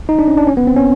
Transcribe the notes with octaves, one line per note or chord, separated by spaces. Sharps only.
D#4
D4
C#4
D4
C#4
B3
C4
C#4